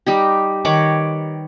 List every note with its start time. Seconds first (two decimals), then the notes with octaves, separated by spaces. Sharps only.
0.06 G3 D#4 G4
0.65 D#3 B4 C#5 D6